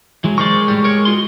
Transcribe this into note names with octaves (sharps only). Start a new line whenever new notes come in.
E3 F#3 G#3
G#3 A#4 C5 D5 C#6
A2 G3
A#4 C#5
F4 F#4 C6